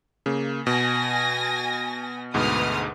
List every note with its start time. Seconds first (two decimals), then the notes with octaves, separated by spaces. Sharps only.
0.26 C#3 A#3
0.67 B2 G#5 A#6
2.34 D2 G#2 B2 B4 D#6 F6